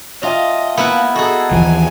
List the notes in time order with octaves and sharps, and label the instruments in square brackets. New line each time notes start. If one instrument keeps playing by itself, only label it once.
[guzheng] F4 [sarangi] D#5 [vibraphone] E5 G5 A5
[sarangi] A#3 [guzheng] B3 E4 B4
[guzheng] F#4 G#4 [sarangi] A4 [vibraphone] D#5 A5 A#5
[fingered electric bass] D#2 E3 F3 [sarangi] G#5